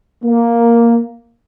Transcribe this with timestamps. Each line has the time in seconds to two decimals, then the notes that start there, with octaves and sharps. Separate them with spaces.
0.24 A#3